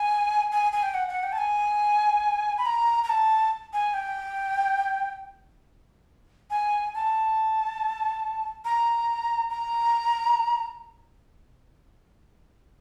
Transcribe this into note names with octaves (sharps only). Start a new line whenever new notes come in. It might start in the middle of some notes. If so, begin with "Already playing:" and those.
Already playing: G#5
G#5
G#5
G5
F#5
F#5
G5
A5
G#5
B5
A#5
A#5
A5
G#5
G5
G#5
A5
A#5
A#5